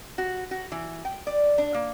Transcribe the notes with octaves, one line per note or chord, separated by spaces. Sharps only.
F#4
F#4
E3
G5
D5
D4
A#3